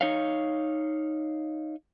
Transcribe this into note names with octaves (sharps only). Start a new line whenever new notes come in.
D#4 C#5 F5